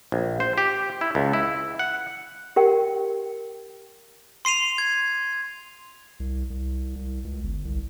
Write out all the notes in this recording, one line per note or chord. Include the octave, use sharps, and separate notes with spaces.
A#1
C5
G4
E4
C#2
E4
F#5
G4 A#4 G5
C6 C7 D#7 F7
G#6
C2
C2
C2
C#2
G1
C2